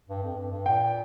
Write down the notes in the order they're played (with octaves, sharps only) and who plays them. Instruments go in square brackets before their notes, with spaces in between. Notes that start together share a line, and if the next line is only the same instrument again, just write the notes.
[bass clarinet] G2
F2
G2
G2
[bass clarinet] A#2 [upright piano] G5